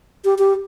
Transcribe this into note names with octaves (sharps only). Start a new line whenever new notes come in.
G4
G4